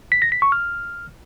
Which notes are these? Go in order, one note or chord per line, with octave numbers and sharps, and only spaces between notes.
B6
A#6
B6
C#6
F6